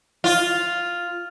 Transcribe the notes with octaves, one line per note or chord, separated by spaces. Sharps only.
F4